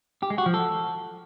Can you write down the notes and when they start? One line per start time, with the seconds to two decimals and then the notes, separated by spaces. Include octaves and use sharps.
0.23 G4
0.30 G#3
0.38 F#4
0.46 F3
0.54 A4